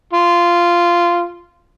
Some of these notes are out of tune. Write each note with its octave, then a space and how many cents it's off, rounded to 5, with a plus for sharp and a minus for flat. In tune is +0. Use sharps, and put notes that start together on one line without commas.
F4 -10